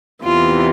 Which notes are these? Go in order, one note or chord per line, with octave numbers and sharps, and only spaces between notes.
E2 C3 E3 F4